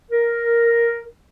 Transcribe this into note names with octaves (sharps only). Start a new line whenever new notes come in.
A#4